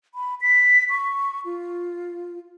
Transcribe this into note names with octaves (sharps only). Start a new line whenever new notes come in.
B5
B6
C#6
F4